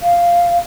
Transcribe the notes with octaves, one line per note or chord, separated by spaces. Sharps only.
F5